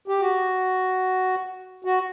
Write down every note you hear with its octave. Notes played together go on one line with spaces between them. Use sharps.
G4
F#4
F#4